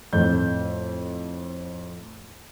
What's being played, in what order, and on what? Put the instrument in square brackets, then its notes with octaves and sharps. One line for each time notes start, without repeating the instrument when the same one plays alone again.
[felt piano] F2 A2 G6